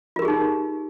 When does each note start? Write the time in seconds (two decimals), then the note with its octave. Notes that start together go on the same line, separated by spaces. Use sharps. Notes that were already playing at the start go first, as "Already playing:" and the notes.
0.16 F4
0.19 A#4
0.22 G4
0.25 G#4
0.28 D#4